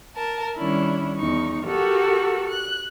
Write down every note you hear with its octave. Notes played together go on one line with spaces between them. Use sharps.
A#4 A5
D#3 G3 C#4 D4 E4
E2 D#4 C#6
F#4 G4 A4 A#4 F#5
F#6